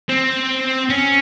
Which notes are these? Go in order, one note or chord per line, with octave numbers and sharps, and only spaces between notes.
C4
C#4